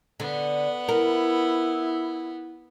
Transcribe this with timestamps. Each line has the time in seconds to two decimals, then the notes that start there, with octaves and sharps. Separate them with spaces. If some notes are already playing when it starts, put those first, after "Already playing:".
0.20 D3 B3
0.89 E4 A#4